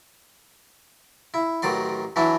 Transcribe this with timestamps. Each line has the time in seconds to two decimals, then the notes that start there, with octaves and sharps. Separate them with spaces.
1.34 E4
1.62 A1 D#3 F#3 D5 C6
2.16 E3 F#3 D4 E4